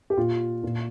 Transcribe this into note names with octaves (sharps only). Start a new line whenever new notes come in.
G4
A#2 F4
A#2